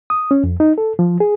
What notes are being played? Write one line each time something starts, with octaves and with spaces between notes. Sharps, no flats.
D#6
C#4
F2
D#4
A4
F3
G#4